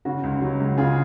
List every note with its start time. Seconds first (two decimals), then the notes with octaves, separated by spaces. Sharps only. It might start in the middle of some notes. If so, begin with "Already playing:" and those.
0.05 C#3 F#4
0.23 C#2
0.42 F#3
0.60 C#2
0.77 C#3 F4 G#4